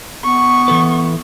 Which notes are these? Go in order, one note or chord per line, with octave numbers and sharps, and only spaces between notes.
B3 C#6
E3 A4 B4